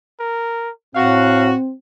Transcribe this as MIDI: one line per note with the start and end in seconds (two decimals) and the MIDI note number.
0.20 0.71 70
0.95 1.54 45
0.95 1.73 60
0.95 1.51 66
0.95 1.52 77